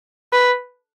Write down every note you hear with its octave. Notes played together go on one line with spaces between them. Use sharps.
B4